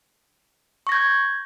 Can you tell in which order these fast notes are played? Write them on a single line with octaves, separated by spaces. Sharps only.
C#6 A#6 G#6 G6